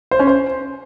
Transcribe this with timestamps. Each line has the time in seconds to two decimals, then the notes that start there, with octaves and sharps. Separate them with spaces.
0.11 C5
0.19 C#4
0.27 C5